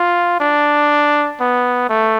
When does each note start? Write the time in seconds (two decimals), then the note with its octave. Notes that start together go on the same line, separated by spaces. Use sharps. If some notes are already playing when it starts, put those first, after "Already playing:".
Already playing: F4
0.40 D4
1.40 B3
1.89 A3